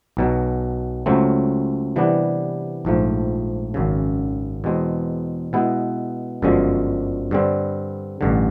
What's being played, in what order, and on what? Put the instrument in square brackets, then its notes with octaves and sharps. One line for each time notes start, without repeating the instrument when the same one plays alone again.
[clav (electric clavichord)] B1 B2 F#3
C#2 C#3 F#3 A3 C4
C3 E3 G3 B3 D4
A#1 G#2 F3 A3
G#1 F#2 C#3
E2 B2 G#3 C4
B2 G#3 B3 E4
G1 F#2 D3 F3 G#3
G2 D3 G3 C4
A1 G2 D3